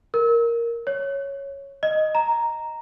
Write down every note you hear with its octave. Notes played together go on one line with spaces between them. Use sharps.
A#4
C#5
D#5
A#5